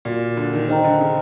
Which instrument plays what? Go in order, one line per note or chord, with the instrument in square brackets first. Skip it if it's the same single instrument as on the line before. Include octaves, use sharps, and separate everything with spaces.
[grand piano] A#2 [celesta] F#4 A#4 D5
[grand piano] D3
D#3
[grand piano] D#3 [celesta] C5 D#5 G5 A#5
[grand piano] D3
C#3